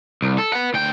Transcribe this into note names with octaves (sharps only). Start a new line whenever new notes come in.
C2
A4
B4 F#5
D2 G5